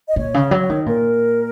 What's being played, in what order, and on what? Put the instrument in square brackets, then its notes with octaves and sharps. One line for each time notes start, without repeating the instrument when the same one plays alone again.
[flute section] D#5
[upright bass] A#2 [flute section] C#5
[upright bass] C#3
F#3
D#3
[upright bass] A#2 [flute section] A#4